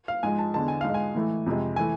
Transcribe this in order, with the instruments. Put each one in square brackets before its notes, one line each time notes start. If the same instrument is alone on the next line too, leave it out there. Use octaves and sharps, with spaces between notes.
[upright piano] F5
G#2 F3 G#3 G#5
A5
E2 D3 G#3 A5
G#5
G#2 F5
G#3 G#5
A2 E3 A3
F2 C3 G#3
E3 A3 G#5